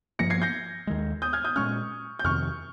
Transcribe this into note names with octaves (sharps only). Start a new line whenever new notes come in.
G2 F3 A#3 A#6 C#7
G#6 C7
G6 A#6
D#2 D#3 G#3
D#6 G6
F6 G#6
D#6 G6
A#2 G#3 C#4 C#6 F6
G6
F2 C3 D#3 C#6 F6